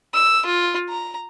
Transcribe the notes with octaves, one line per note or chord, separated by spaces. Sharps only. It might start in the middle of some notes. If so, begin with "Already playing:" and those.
E6
F4
A#5